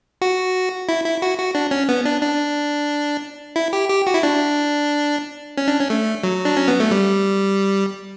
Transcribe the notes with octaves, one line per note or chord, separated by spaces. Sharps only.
F#4
E4
E4
F#4
F#4
D4
C#4
B3
D4
D4
E4
G4
G4
F#4
E4
D4
C#4
D4
C#4
A3
F#3
D4
C#4
B3
A3
G3